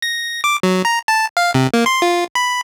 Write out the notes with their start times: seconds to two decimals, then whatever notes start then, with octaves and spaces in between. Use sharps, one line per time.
0.02 A#6
0.44 D6
0.63 F#3
0.85 A#5
1.08 A5
1.37 F5
1.54 C3
1.74 A#3
1.86 C6
2.02 F4
2.35 B5